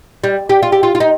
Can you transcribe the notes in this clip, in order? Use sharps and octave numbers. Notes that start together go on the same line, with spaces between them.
G3
G4
F4
G4
F4
F4
D#4